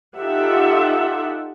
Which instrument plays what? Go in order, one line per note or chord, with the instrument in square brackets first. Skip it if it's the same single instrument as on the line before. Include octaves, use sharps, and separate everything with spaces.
[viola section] D#4 F4 G4 A4 E5 F#5